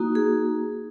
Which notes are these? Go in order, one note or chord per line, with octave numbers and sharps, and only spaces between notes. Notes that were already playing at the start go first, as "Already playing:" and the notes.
Already playing: A#3 D#4 F#4
G#4